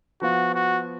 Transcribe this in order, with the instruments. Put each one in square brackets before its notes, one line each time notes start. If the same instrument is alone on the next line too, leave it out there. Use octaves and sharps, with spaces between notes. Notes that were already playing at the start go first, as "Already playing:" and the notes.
[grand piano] F3 B3 F4 [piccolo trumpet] F#4
[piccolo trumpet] F#4